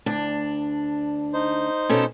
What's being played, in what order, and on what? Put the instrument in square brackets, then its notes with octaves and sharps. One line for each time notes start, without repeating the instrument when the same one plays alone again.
[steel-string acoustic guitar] D2 D4
[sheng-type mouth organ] D#4 C5
[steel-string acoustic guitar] B2 C#4 A4